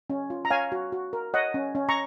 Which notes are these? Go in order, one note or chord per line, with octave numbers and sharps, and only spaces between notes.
C#4
F4
A#5
C#5 F5 G#5
F#4
F#4
A#4
C#5 D#5 F#5
C#4
C#4
A#5 C#6